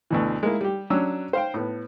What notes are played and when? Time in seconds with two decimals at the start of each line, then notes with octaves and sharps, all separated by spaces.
0.11 D2 B2 E3
0.43 G#3 A#3 E4
0.61 G3 G4
0.90 F#3 C#4 D4 E6
1.33 C5 F5 G5
1.54 A2 B3